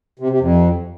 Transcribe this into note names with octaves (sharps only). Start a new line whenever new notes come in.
C3
C3
F2